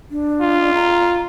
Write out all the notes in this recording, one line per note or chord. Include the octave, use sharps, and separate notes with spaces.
D4
F4
A#5